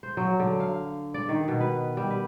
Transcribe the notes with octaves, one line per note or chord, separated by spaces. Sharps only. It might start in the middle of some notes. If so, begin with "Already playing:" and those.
C5
F#3
D3
F5
D5
D#3
B2
B4
G3
B4